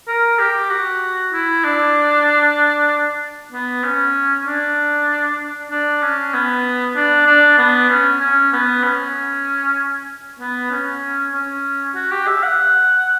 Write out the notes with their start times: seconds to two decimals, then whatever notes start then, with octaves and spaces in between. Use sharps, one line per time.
0.08 A#4
0.39 G4
0.70 F#4
1.33 E4
1.64 D4
3.52 B3
3.83 C#4
4.46 D4
5.71 D4
6.02 C#4
6.33 B3
6.96 D4
7.27 D4
7.58 B3
7.90 C#4
8.20 C#4
8.53 B3
8.83 C#4
10.40 B3
10.71 C#4
11.33 C#4
11.95 F#4
12.11 G4
12.27 E5
12.43 F#5